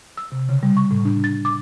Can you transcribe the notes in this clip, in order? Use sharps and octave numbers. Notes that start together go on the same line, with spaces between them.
E6
C3
C#3
G3
C#6
A2
D4
A6
D6